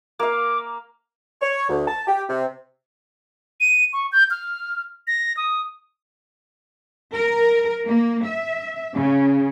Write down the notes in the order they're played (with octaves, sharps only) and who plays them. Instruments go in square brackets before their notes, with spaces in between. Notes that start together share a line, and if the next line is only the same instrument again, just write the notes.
[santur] A#3 F5 [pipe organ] D6
[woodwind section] C#5
D2
A5
G4
C3
[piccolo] D#7
C#6
G6
F6
A#6
D#6
[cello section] A#4
A#3
E5
C#3